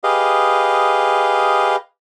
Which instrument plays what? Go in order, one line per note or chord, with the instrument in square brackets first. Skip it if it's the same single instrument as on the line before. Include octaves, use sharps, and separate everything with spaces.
[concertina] G4 G#4 B4 D#5 F5